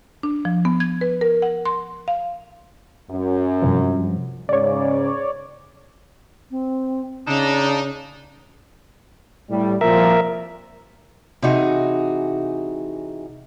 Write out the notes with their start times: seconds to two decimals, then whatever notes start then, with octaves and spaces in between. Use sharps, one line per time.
0.23 D4
0.45 F3
0.65 B3
0.80 G#6
1.01 B4
1.21 A#4
1.42 F#5
1.65 C6
2.08 F5
3.11 F#2
3.62 G2 C3 F3
4.49 G#2 C#3 C#5 D5
6.51 C4
7.27 C#3 D4 D#4
9.50 A2 G3
9.81 C2 A#2 F3 A#4 E5
11.42 C3 E3 D#4 F#4 G#4